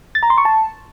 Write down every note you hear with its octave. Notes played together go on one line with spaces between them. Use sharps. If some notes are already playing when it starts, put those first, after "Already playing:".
A6
A#5
C6
C#6
A5